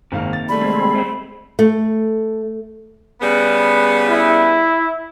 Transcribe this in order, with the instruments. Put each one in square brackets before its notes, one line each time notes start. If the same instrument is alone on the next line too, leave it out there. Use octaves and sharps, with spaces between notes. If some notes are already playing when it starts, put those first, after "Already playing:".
[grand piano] G#1 F5 [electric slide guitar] C3 D#3 A#3
[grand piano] A6
[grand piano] G3 A3 [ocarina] B5
[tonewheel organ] G#3 C4
[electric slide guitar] A3 C5
[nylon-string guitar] A3
[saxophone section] C#3 G3 B3
[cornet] E4